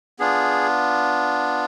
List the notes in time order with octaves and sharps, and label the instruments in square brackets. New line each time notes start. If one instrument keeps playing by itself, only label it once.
[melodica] B3 D4 F4 G#4